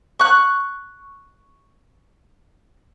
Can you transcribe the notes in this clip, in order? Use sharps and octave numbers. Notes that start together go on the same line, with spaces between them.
C#6 F#6